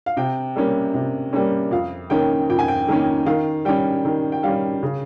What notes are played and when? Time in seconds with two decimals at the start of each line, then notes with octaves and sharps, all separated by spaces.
0.06 F5
0.17 C3 G5
0.56 G3 A#3 C#4
0.94 C3
1.33 G3 A#3 C#4
1.71 F2 F5
2.10 D#3 A#3 C#4 G5
2.50 F2 G5
2.59 G#5
2.68 G5
2.88 D#3 A#3 C#4
3.26 D#3 F5
3.65 G3 C#4 G5
4.05 D#3
4.32 G5
4.43 G3 C#4 F5
4.82 C#3